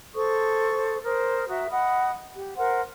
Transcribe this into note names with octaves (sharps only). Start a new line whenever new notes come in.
A4 C5 C#6 D#6
A#4 C5 D#6
F#4 E5 A#5 D#6
D#5 F#5 B5 D#6
G4
A#4 C5 F#5 C6